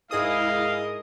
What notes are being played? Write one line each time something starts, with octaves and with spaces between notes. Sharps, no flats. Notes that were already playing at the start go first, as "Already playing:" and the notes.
G#2 E4 G#4 A#4 D#5 F5 D#6